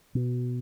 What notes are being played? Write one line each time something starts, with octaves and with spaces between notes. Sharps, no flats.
B2